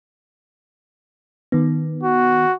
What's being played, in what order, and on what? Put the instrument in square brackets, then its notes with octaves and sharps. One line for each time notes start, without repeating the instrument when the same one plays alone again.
[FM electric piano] D#3 B3
[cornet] F#4